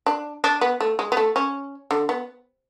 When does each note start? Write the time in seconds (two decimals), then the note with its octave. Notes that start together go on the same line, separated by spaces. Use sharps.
0.06 D4
0.44 D4
0.61 B3
0.81 A3
0.99 G#3
1.12 B3
1.17 A3
1.36 C#4
1.91 D3
2.09 B3